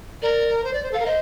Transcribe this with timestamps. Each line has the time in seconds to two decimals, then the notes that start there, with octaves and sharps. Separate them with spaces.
0.22 A#4 D5
0.64 C5
0.73 D5
0.83 C5
0.91 A4
0.94 F5
0.99 A#4
1.06 C5 D#5